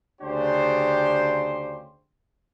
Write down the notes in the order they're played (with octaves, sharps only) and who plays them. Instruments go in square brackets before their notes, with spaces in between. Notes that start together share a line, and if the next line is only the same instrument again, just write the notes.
[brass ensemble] D2 C#3 D4 G4 C5